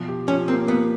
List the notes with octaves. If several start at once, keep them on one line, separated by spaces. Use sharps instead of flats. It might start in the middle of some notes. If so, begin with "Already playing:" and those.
Already playing: B2 F3
G4
F3 C#4
A#3 C4
A#3 B3